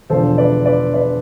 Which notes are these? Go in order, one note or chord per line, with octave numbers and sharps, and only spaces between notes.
E1 E2 D3 F3 A4 C5
B4 D5
B4 D5
B4 D5